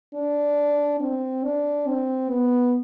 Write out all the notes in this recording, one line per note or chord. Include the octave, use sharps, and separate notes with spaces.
D4
C4
D4
C4
B3